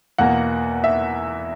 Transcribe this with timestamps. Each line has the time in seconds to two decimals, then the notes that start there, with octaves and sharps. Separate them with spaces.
0.18 E2 B2 A#3 F#5
0.84 E5